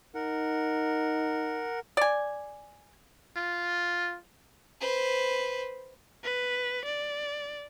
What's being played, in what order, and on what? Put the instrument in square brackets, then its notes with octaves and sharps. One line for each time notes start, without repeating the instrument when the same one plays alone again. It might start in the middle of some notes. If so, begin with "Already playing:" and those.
[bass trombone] D#4 [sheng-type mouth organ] A#4 F#5
[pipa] D5 G#5
[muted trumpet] F4
[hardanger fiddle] B4 C5
[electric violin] B4
D5